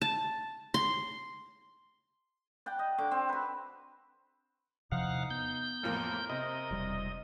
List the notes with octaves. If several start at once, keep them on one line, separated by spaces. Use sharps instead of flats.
A5
C6
D5 F#5 G5
D#5
D3 F#4 D6
C4
F#4 B4
E2 C3 F3 D#4 F5 F#5
B3 G6
A1 F2 A#3 A#4
C3 D#5
E1 G3